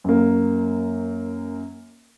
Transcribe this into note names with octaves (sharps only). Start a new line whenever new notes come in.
F#2 A#3